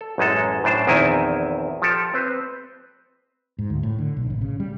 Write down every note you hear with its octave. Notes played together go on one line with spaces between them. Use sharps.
A4
A1 F#2 G#3 A4
F#2 A2 D4 C5 A5
A#1 E2 D#3 C4 E4 G#5
F3 G4 A4
C4 B4 C5
G#2
D2
A2
D3
B1
A1
C#3
G3